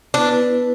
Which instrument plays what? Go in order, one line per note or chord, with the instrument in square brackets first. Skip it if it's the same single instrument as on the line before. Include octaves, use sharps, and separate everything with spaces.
[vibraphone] B3 E4 B4 [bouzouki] D4